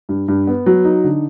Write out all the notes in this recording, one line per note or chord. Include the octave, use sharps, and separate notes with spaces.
G2
G2
B3
F#3
D#4
D3